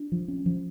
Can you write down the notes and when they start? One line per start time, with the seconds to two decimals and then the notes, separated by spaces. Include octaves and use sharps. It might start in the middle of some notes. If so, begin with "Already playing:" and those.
Already playing: D4
0.12 F3
0.28 C#4
0.46 F3